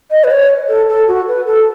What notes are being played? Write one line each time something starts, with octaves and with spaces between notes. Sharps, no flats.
D#5
B4
C#5
A4
A4
F#4
B4
A4